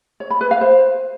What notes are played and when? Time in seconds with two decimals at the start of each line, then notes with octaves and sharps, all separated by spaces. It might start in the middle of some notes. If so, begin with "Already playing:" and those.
0.20 C#5
0.30 B5
0.41 B4
0.51 F5
0.61 C5